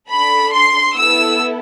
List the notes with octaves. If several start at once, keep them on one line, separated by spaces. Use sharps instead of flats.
D4 A4 B5
C6
B3 E4 A4 E6